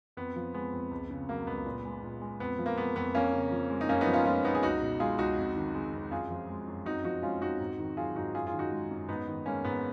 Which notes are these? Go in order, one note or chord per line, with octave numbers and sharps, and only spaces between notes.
F2 B3
F3
G#3 B3
F2
C#2
C#3
F#3 A#3
C#2 B3
A#2
G#3
A#2
G#3
F2 B3
F3
A#3
G#3 B3
F2 B3
F2 A#3 C#4
C#3
F3
G#3
D#4
F#2 A#3 C#4
B3 D#4
F3
C#4 F4
G#3 C#4 F4
F#2 B3 D#4
G#4
C#2 D#4 F#4
B2
G#3 F4 G#4
C#2 D#4 F#4
F2
D#3
G#3
F2
F#2 F4 G#4
F3
G#3
F#2
F2 D#4 F#4
F3 D#4 F#4
G#3 C#4 F4
F2 D#4 F#4
G#2
D#3
F#3 F4 G#4
G#2 D#4 F#4
F#2 F4 G#4
F4 G#4
D#3
D#4 F#4
G#3
F#2
G#2 B3 D#4
D#3
G#3 A#3 C#4
G#2 B3